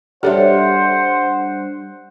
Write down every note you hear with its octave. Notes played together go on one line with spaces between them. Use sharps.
G3 D4 A4 C5 C#5 E5 F#5